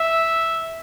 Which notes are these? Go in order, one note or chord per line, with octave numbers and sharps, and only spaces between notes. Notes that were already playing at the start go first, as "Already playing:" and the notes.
Already playing: E5